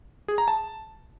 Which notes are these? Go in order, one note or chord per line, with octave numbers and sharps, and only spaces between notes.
G#4
A#5
A5